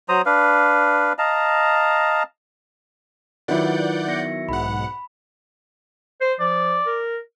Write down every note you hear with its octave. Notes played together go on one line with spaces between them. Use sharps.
F#3 C5 A#5 D#6
D4 B4 F5
D#5 F5 A5 A#5
D#3 F#3 E4 F4 B4 D5 F#5 G6
B3 A#6 C#7
B1 G#2 F#5 B5
C5
F3 D5
A#4